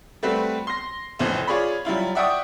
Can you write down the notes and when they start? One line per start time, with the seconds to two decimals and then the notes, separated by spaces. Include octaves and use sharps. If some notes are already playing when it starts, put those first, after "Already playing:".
0.23 G3 A3 C4 F#4 B4
0.67 C6 A#6
1.19 F1 F2 A2 E3 C5
1.47 F4 G#4 C#5 D5 B5
1.85 F#3 G3 E4 F4
2.15 D5 E5 F#5 G5 C#6 D#6